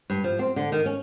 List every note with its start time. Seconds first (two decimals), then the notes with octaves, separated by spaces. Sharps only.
0.10 G2
0.24 F3
0.39 C4
0.56 D3
0.72 D#3
0.86 C#4